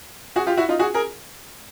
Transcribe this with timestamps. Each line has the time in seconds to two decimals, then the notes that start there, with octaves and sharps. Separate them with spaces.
0.36 F#4 G#4
0.47 F4 G4
0.57 E4 F#4
0.69 D#4 F4
0.79 F#4 G#4
0.94 G#4 A#4